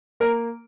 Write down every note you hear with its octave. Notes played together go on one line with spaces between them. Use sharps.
A#3 A#4